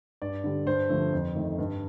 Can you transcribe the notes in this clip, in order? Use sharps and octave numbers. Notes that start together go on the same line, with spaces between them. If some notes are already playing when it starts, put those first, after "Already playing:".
G2 D5
D3 G3
G2 C5
D3 F3 A3
F2
D#3 A3
G2